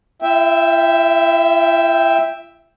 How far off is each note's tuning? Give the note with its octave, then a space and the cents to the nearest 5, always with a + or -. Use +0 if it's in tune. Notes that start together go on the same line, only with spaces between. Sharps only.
E4 +45 E5 +0 G5 +5